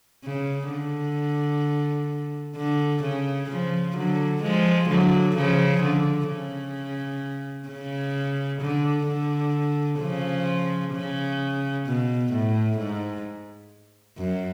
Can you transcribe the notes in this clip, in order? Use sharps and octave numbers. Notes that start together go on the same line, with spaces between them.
C#3
D3
D3
C#3
C#3 F3
D3 F#3
F3 G#3
D3 F#3
C#3 F3
D3
C#3
C#3
D3
D3
C#3 F3
C#3
B2
A2
G#2
F#2